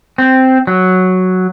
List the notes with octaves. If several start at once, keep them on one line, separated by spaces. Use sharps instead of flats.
C4
F#3